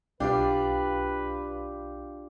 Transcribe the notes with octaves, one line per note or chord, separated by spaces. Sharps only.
B1 D4 F4 G4 B4 D5 F5